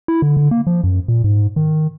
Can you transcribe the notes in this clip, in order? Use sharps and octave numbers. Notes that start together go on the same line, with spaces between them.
E4
D3
D3
A#3
F3
F#2
A#2
G#2
D#3